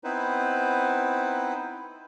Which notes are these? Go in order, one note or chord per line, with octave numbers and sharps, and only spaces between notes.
B3 C4 D#4 E4 B4 C5